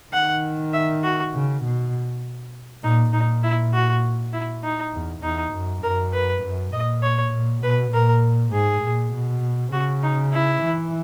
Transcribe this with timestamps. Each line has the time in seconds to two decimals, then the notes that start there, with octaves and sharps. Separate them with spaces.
0.13 D#3 F#5
0.73 E5
1.03 F#4
1.34 C#3
1.64 B2
2.83 A#2 D#4
3.13 A#2 D#4
3.43 E4
3.74 F#4
4.33 E4
4.64 D#4
4.94 E2
5.23 E2 D#4
5.53 F#2
5.83 F#2 A#4
6.13 B4
6.43 F#2
6.73 A#2 D#5
7.03 C#5
7.33 A#2
7.63 B2 B4
7.93 A#2 A#4
8.53 G#2 G#4
8.83 A#2
9.13 B2
9.73 C#3 F#4
10.03 D#4
10.33 E4
10.63 E3